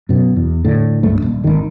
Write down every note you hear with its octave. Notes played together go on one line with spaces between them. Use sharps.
F#2 B2
E2
A2 D3
C2 G2 A3
D#1
G#1 D#3